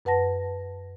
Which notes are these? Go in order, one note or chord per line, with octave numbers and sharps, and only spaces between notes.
F#2 B4 F#5 A5 A#6